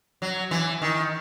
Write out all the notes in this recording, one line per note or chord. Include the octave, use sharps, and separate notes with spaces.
F#3
E3
D#3